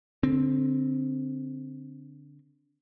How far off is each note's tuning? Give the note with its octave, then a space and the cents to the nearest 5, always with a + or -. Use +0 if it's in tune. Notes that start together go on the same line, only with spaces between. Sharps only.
D3 -15 C4 +0